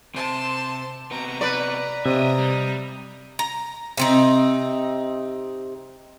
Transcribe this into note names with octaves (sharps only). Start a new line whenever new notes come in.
C3 C5 A5
C3 B3 A#5
B4 D5
C3 C5 D#5 E5 A#5 D#6
G3
A#5
C3 C4 D#4